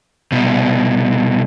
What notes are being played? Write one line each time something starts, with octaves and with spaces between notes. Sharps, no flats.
C2 B2